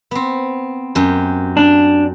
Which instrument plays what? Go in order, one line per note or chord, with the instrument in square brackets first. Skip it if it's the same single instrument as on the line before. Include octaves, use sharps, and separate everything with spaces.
[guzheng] B3 C4
F#2 G4
[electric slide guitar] D4